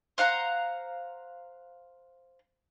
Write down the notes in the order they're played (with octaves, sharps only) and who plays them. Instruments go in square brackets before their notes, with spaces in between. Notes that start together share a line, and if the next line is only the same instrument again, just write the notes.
[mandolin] C5 F5 F#5 A#5